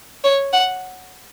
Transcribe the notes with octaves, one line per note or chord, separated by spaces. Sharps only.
C#5
F#5